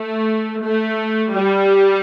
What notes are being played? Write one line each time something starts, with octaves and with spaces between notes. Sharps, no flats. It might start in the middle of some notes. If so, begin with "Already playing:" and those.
Already playing: A3
A3
G3